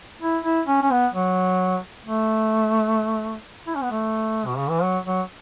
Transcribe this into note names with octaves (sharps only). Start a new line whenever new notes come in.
E4
E4
C#4
C#4
B3
F#3
A3
E4
C#4
B3
A3
B2
C#3
E3
F#3
F#3